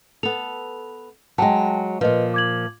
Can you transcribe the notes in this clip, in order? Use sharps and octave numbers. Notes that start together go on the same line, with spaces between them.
B3 A4 F7
F#3 G#3 G5 A5
A#2 F3 B4 D#5
D6 G#6 F#7